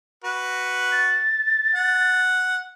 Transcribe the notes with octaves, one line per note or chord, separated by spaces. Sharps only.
F#4 B4
A6
F#5